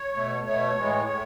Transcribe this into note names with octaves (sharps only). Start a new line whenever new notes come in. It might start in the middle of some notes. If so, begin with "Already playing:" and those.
Already playing: C#5
B2 A3
B2 A3 C#5
A2 E3 G#3
A2